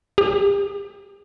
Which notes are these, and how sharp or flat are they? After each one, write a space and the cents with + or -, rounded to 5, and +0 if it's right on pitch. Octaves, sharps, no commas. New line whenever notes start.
G4 +40